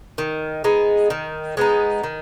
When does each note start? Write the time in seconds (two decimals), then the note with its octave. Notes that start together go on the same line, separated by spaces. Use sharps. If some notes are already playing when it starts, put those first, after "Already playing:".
0.18 D#3
0.64 G#3 B3 D#4
1.10 D#3
1.57 G#3 B3 D#4
2.03 D#3